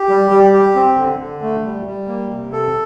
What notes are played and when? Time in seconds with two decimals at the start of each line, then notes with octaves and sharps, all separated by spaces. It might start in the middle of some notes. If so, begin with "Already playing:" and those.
Already playing: G4
0.09 G3
0.31 G3
0.54 G4
0.76 C4
0.97 D3
1.20 D3
1.42 A3
1.65 G3
1.86 G3
2.08 A#3
2.30 C3
2.52 A4